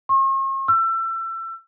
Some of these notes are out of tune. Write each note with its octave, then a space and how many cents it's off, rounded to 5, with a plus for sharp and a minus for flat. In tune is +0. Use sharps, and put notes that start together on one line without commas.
C#6 -45
E6 +30